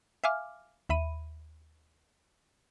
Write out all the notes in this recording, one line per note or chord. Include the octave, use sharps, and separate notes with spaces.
E5 F5 G#5 D6 F6
D#2 E5 B5 D#7